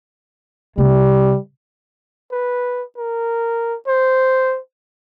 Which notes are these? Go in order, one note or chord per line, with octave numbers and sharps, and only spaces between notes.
C3 G3
B4
A#4
C5